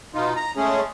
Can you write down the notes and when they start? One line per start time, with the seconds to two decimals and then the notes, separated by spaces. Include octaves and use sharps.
0.14 B2 D#4 F4
0.36 A#5
0.57 G#3 A3 C#4 G#4